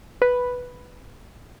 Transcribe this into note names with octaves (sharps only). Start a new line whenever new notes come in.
B4